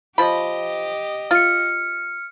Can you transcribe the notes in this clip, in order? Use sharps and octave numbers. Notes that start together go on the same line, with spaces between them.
F3 G4 D#5 B5
F4 F6 C#7